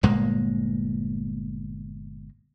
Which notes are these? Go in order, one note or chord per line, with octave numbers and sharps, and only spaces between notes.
G1 A#2 G#3 A#3